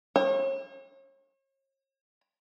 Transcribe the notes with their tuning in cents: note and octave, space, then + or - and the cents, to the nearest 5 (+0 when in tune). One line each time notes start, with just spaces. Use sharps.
C#5 -45